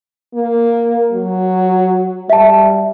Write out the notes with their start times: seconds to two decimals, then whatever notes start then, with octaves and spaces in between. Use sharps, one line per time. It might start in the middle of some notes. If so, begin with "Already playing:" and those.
0.34 A#3
1.13 F#3
2.30 G3 E5 A5